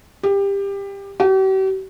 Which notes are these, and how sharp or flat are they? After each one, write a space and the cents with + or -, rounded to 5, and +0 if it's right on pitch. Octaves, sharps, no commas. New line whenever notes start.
G4 +20
G4 -45